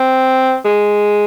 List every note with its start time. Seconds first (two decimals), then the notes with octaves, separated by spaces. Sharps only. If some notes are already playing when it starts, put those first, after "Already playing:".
Already playing: C4
0.65 G#3